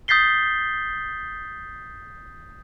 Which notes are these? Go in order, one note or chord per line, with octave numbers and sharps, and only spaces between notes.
D#6 G6 A6 B6 C7 G7